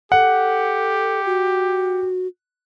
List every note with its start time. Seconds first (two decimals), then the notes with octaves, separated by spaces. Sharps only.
0.12 G4 A4 F#5
1.26 F#4